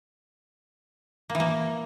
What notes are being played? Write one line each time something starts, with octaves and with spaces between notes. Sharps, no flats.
A#3
E3
A#3